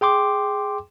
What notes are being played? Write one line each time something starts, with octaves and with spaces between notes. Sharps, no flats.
G#4 G5 C6 D6